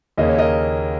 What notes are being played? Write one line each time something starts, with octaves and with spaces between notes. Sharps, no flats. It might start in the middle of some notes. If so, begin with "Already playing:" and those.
D#2 C#3 A#3 C#4 D#5
C#5
A#4 D#5